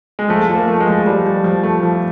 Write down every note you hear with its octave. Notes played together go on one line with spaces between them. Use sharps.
G#3
F3 A3
F3
A#3
A3
G#3
F3
F3 G3
F3
F3
A3
F3